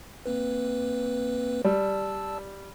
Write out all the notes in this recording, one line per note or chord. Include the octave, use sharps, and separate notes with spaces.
A#3 C4 B4
G3 D5 A5 E6